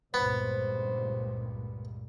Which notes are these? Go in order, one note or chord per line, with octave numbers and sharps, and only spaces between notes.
C#2 G2 A#2 B3 C5